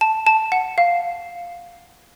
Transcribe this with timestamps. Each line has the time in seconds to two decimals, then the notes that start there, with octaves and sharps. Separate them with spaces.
0.01 A5
0.27 A5
0.52 F#5
0.78 F5